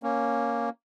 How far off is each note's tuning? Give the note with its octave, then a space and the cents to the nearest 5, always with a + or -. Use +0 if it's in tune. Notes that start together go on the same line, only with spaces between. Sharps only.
A#3 +5 C#4 +0